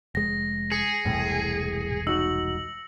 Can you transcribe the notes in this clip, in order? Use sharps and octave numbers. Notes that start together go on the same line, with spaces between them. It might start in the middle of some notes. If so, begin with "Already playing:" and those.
F1 G#3 A#6
G#4 C#7
E1 C2 A2
D#4 F#4 E6 F#7